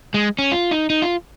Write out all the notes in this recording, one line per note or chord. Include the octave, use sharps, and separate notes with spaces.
G#3
C#4
F4
D#4
D#4
F4